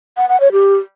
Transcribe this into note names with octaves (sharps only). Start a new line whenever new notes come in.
F#5
F#5
C#5
G4